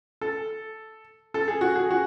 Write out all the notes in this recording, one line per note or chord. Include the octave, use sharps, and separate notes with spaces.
A4
A4
G#4
F#4
G#4
F#4